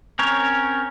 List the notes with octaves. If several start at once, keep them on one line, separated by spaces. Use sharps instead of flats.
C4 C#4 A#4 C#5